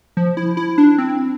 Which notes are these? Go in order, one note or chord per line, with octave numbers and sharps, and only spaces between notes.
F3
E4
E4
D4
C4